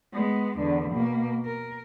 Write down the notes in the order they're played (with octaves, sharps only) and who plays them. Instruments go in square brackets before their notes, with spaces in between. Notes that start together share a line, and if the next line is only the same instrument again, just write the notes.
[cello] G#3 B3
E2 D3
B2 A#3
A#4